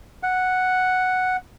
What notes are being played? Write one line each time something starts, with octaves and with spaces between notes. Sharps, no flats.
F#5